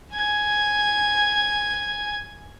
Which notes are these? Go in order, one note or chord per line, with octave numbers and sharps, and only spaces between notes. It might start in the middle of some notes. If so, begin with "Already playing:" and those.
G#5 G#6